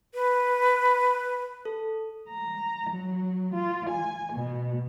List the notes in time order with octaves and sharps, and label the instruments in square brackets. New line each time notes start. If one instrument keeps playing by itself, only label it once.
[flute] B4
[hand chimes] A4
[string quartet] A#5
F#3
F4
G#5
B2